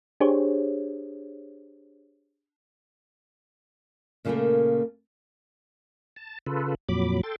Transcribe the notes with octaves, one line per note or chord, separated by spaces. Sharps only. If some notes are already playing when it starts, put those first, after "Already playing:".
D4 G4 G#4 C5 C#5
A#2 C#3 F#3 G3 A3 A#3
A5
C#3 F4 A4 B4
F2 A#2 F#3 B5 D6
A4 G5 C6 A6